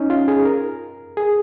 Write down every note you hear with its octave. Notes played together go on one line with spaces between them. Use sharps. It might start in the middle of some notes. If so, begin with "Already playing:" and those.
Already playing: C#4 D#4
F4
G#4
A#4
G#4